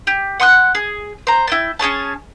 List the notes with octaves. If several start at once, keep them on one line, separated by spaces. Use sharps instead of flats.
G4
F#5 C6 D#6 F#6
G#4
C5 A#5
E4 G5 A5
C#4 G#4 C#5 A5